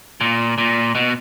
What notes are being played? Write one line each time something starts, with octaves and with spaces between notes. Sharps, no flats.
A#2
A#2
B2